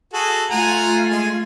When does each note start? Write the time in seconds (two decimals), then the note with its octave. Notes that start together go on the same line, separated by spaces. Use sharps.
0.13 F#4 G#4 A4
0.50 A3 F4 F#5 G#5 A#5
1.09 G#3 G#5